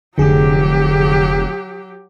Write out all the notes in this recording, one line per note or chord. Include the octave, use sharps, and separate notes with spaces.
F1 D3 F#3 G4 G#4